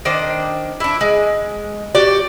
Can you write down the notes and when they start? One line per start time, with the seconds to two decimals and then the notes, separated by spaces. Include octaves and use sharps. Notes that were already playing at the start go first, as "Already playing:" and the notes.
0.05 D#3 D4 C5
0.80 D4 E4
1.01 G#3
1.95 F#4 G4 D5